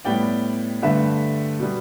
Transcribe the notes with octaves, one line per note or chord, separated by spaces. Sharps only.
A2 G3 B3 D5 G5
G2 D3 A3 B4 E5
B2 G3 B3